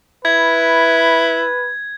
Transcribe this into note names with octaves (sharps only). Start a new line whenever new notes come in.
E4 B4 G#6